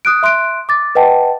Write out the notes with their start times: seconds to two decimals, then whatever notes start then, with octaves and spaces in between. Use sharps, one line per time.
0.05 D#6 F#6 D7
0.23 E5 C6 F#6 D7
0.69 D6 A6
0.95 B4 D#5 F#5 G5 A5